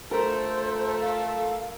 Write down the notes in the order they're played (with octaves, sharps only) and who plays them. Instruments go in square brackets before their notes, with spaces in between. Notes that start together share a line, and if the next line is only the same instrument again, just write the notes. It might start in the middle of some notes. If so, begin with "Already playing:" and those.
[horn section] A3 F4 A4 [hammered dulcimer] A#4 [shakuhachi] C5
[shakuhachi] F5